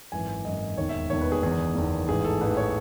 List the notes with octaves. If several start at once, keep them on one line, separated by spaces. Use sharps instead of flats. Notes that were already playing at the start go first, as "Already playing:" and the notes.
G#1 F#2 E3 G#5
G#1 F#2 E3 D#5
E1 D#2 D#3 C#5
E5
E1 D#2 D#3 C#5
B4
G#4
F#1 E2 D#3 G#4
F#1 E2 D#3
A1 G#2 E3 G#4
A4
A1 G#2 E3 B4
C#5